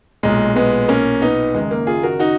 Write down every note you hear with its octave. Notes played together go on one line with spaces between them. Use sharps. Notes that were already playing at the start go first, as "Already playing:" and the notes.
B1 A#2 G#3
G#3 B3
A#3 C#4
B3 D#4
F#1 F#2 D#3 G#3
A#3
F4 G#4
F#4 A#4
D#4 F#4